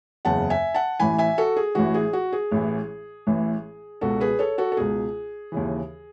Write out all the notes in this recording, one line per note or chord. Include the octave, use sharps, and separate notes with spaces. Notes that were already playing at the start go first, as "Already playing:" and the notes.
F#1 E2 C#3 F#5 A5
E5 G#5
F#5 A5
A1 A2 E3 G#5 B5
E5 G#5
F#4 A4
G#4
A1 A2 E3 F#4
G#4
F#4
G#4
A1 A2 E3
A1 A2 E3
C#2 B2 F#4 A4
G#4 B4
A4 C#5
F#4 A4
A4
C#2 B2 G#4
D#2 C#3 E3